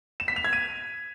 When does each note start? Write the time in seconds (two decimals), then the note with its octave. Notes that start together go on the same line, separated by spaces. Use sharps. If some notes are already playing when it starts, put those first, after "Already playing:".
0.20 E7
0.28 B6
0.36 F7
0.44 G#6
0.53 D#7